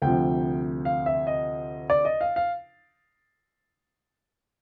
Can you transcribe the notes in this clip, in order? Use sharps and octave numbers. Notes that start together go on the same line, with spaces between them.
D2 C3 F3 G5
F5
E5
D#5
D5
D#5
F5
F5